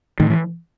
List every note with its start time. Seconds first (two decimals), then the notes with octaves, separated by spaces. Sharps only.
0.20 A2 D#3
0.30 E3